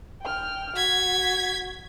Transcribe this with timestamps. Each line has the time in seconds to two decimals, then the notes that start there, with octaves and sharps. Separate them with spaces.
0.22 G5 F6
0.76 F#4 G#6 B6